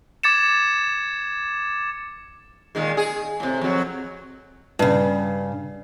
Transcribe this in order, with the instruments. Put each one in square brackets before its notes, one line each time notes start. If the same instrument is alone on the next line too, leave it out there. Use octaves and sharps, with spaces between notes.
[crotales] D6 G#6 A6 C#7 E7
[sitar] A#2 D#3 G#3
G#4
A2 C3
F2 F#3
[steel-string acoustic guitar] G2 C#3